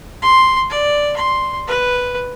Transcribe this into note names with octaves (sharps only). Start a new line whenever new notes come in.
C6
D5
C6
B4